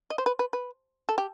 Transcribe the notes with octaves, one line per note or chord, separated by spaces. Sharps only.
D#5
C5
B4
B4
B4
A4
G4